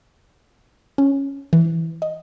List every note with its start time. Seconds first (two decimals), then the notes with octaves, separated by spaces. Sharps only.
0.98 C#4
1.53 E3
2.02 D#5